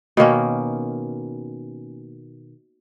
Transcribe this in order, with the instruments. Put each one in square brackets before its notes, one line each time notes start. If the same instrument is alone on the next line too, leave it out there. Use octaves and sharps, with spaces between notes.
[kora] B2 D#3 A#3 C#4